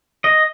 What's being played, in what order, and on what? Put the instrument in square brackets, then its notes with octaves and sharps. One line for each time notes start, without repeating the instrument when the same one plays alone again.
[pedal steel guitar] D#5